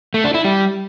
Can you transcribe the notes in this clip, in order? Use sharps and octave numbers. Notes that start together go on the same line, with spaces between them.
A3
D4
E4
G3